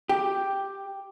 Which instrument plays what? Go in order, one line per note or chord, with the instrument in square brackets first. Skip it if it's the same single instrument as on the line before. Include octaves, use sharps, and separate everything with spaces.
[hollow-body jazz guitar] G4